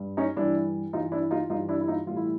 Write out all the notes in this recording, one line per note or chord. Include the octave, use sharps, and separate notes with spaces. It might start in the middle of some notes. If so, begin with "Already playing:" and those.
Already playing: G2
C#4 D#4
G2 E3 G3 D4 E4
G2 E3 G3 D#4 F4
D4 E4
D#4 F4
G2 E3 G3 D#4 F4
D4 E4
E4
D#4 F4
A2 E3 G3 F4
E4